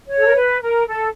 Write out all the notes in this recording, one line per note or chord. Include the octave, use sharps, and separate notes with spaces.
C#5
A4
A#4
B4
A#4
A4